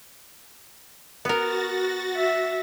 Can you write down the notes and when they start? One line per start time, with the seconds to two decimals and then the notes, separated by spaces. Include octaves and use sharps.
1.25 B3 F#4 A#4 A6 A#6
2.16 E5